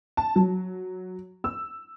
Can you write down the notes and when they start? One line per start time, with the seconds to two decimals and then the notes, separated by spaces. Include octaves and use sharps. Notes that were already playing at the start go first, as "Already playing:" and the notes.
0.17 A5
0.36 F#3
1.44 E6